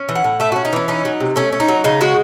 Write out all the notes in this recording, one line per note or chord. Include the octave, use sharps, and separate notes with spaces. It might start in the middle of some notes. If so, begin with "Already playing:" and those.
Already playing: C#4
E3
F#5
A2
A3 E5
C#4 F#4
D#4
E3 C#4
C#4 D#4
F#3
C3
A3 C#4
C#4
D#4
F#3
C#3 D#4
G#3 F#4